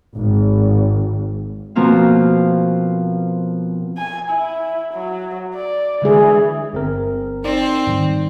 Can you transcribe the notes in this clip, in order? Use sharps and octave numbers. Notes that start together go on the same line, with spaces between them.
G#1
B2 F3 A#3 C4 F5
G#5
E4
F#3
D5
D3 E3 G#3 G#4
G1 C4 A#4
C4 D#4 D5
G#2 D#3 G3